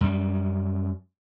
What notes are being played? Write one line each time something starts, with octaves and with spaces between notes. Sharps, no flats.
F#2 G3